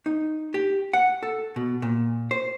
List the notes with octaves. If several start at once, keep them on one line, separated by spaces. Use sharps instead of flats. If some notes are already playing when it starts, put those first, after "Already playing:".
D#4
G4
F#5
A4
B2
A#2
C5